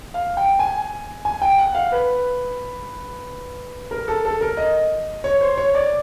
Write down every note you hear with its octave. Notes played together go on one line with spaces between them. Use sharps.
F5
G5
G#5
G#5
G5
F#5
F5
B4
A#4
A4
A4
A#4
D#5
C#5
C5
C#5
D5